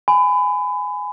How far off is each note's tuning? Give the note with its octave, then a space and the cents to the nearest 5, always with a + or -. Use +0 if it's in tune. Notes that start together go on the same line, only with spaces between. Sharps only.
G#5 +0 B5 +30